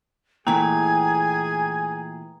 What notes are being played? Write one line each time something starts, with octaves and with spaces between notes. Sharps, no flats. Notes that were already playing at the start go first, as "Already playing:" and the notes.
A#2 E3 A3 G#4 G5 G#5 A#5